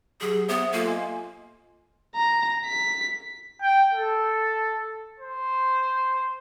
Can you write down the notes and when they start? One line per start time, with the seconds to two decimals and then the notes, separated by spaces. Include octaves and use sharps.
0.21 F#3 G4 G#4
0.48 B3 C5 E5 D#6
0.72 A#3 F4 A4
0.85 D#5 G#5 C6
2.15 A#5
2.66 B6
3.61 G5
3.93 A4
5.20 C5